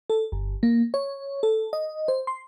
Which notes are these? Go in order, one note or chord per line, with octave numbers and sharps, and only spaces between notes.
A4
G1
A#3
C#5
A4
D#5
C5
C6